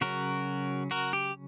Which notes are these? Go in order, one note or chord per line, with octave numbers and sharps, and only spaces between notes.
C#3 F#3 C#4 F#4 A#4
F#4 A#4
G4